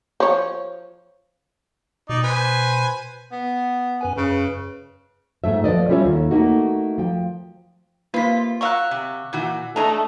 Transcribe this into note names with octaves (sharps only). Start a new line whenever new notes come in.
F3 C#5
B2 D#4 D5
B4 C5 G#5
B3
F#2 B4 G#5
F#2 C#3 B4
G#2 A3 E5
F3 B4 D5 D#5
G3 C#4 F4 A4 C#5 E5
D#2
A3 A#3 D#4 F#4
F3 G5
C3 A#3 F4 B4 B6
F#3 A#4 F5 C#6 E6 F#6
C3
A#2 E3 F#4
A3 D4 G#4 D#5 A#5